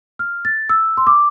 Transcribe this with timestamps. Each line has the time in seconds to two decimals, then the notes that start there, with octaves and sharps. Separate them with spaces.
0.19 F6
0.45 A6
0.69 E6
0.97 C6
1.07 D6